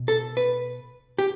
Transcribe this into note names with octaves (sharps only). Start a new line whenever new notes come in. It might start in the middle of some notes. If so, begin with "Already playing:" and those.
Already playing: B2
A4
B4
G4